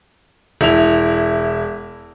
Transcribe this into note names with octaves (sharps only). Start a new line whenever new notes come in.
E1 E4 F7